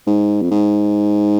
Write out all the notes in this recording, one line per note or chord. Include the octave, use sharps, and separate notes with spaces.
G#2
F2
G#2